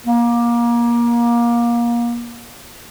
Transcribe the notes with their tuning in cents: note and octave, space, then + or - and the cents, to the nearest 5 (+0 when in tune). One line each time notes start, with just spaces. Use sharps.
A#3 +25